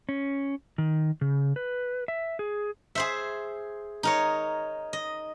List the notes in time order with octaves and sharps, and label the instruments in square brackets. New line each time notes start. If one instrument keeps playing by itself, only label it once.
[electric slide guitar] C#4
D#3
C#3
B4
E5
G#4
[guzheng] G#4 C5 E5
D#4 A#4 C#5
D#5